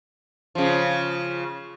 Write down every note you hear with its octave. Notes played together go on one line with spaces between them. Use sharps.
C#3 F3